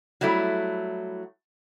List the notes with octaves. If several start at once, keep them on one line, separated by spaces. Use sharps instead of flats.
F#3 G3 A3 E4